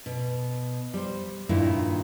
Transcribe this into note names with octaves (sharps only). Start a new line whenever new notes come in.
B2
G3 C5
G2 A#2 D#3 E4